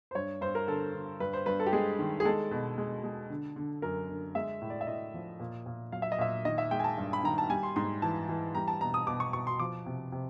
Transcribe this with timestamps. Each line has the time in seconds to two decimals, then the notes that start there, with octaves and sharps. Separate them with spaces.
0.11 C5
0.15 G2 C#5
0.41 G2 C5
0.55 A#4
0.68 D3 A4
0.94 D3
1.20 G2 B4
1.33 C5
1.46 G2 B4
1.60 A4
1.66 G4
1.73 G#3 G#4
1.99 D#3
2.20 G#4
2.25 G#3 A4
2.51 B2
2.78 G#3
3.04 G#3
3.30 D3
3.56 D3
3.82 F#2 A#4
4.09 D3
4.35 G#3 E5
4.61 A2
4.70 D5
4.81 E5
4.87 A2 D#5
5.14 F3
5.40 A#2
5.66 A#2
5.92 F#3 F5
6.02 E5
6.12 D#5
6.19 A#2 E5
6.45 D#3 D#5
6.58 E5
6.71 G#3 G5
6.80 G#5
6.84 A5
6.98 G2
7.13 B5
7.23 D#3 A#5
7.38 A5
7.50 G3 G#5
7.63 C6
7.76 G#2 C6
8.02 E3 A5
8.29 E3
8.55 G3 A#5
8.68 A5
8.81 B2 A#5
8.94 D#6
9.07 B2 D6
9.20 C#6
9.33 B2 C#6
9.47 C6
9.60 F3 D6
9.86 C3
10.12 C3